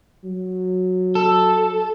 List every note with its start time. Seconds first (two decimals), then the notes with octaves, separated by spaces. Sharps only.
0.24 F#3
1.15 A4